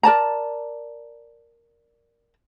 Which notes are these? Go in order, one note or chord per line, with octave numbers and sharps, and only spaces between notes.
A#4 D5 A5 A#5